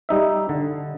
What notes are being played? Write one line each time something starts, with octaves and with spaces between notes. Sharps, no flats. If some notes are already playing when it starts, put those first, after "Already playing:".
G3 D#4 E5
D3